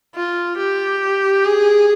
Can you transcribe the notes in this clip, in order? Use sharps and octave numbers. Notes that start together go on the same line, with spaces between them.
F4
G4
G#4